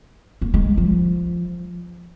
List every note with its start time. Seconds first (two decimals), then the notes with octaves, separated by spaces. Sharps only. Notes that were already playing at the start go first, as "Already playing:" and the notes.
0.41 A#3
0.54 G#3
0.65 F#3
0.77 F3